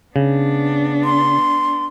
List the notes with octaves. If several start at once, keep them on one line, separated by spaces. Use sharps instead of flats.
C#3 B3 D4
C6